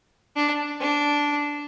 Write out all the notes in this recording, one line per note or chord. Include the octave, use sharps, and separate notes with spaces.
D4
D4